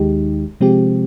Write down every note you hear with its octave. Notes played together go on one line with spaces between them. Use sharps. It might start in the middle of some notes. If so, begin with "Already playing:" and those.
Already playing: D#2 D#3 G#3 D#4 G4
C3 F3 G#3 C4 G4